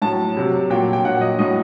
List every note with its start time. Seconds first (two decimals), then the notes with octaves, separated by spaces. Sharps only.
0.02 A2 F#3 A5
0.36 C3 F#3
0.70 A#2 F#3 G5
0.93 G5
1.04 A#2 F#3 F#5
1.21 D#5
1.39 A2 F#3 D#5